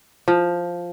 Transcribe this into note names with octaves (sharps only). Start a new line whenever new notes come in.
F3